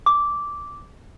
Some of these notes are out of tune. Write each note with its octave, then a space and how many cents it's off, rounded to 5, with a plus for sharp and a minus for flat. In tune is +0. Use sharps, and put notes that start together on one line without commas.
D6 -10